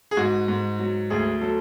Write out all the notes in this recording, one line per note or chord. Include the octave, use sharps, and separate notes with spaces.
G#4
G#2 F#4
G#2
F#3
D2 G#4
F#3 A4